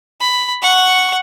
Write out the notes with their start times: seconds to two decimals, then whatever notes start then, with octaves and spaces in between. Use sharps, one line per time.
0.21 B5
0.62 F#5 C#6